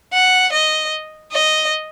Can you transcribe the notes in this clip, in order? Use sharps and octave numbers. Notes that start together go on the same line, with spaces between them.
F#5
D#5
D#5